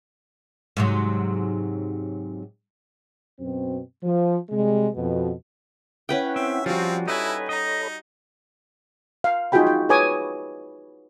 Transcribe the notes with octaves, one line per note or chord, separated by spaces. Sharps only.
G#2 C3 F#3
F#2 B2 C4
F3
C3 G3 G#3
F2 B2
C#4 E4 B4 F#5 G5
C4 E5
F3 G3 C4 F#4 F5
D#4 E4 A4 B4 C#5 G#5 B5
D#4 D#5 A#5
F5
D#4 F4 F#4 G#4 G5 B5
G5
G#4 B4 C#5 G#5 D6 D#6